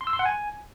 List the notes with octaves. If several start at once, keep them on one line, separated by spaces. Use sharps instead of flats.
C6
E6
C6
F#5
G#5